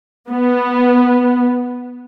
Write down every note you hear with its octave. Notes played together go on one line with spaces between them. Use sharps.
B3